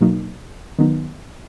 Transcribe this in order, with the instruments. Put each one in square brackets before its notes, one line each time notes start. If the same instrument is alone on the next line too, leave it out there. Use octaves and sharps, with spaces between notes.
[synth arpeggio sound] B2 F#3 A#3 D#4 F#4
D#3 F#3 B3 D#4